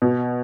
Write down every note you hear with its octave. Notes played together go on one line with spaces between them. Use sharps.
B2